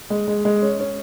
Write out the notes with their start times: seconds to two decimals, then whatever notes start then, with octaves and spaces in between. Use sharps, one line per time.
0.10 G#3
0.28 G#3
0.45 G#3
0.62 C#4
0.80 C#4